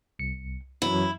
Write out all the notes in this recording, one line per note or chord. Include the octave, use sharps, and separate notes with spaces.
C2 C#7
F#2 E3 F#3 E4